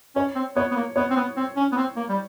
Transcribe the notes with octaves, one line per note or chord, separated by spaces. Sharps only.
C#4 C#5
C4
B3 C#5
B3
A#3
B3 C#5
C4
B3
C4
C#4
B3
C4
A#3
G3